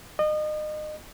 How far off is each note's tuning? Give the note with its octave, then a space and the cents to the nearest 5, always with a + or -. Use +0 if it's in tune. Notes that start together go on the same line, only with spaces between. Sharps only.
D#5 -30